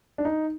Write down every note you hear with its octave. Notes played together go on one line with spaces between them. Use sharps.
D4
D#4